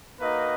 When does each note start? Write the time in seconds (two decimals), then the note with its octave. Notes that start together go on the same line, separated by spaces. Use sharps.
0.20 A#3 D#4 F#4 B4 D#5